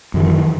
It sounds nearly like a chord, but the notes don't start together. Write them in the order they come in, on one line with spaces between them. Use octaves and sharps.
F#2 D#3 E3